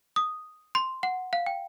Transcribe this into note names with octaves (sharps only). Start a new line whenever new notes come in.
D#6
C6
F#5
F5
G5